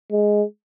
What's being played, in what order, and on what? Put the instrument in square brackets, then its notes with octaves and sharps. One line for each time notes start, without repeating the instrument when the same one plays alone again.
[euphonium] G#3